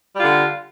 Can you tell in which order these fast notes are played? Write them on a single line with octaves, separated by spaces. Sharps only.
G3 F4 D3